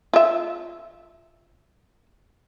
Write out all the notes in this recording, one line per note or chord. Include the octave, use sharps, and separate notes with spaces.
F4 E5